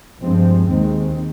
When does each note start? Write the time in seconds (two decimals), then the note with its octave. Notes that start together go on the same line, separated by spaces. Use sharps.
0.22 G2 F3 G#3 C4
0.69 D#2 D#3 G#3 C4